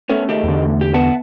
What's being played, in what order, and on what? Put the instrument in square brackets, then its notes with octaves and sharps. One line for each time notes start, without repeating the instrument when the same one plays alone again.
[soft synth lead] A3 [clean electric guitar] B3 C#4
[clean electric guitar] C#2 D#3 G4
[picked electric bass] E2 D3
[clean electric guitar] G4
[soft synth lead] B3 [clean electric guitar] E5 F#5 A5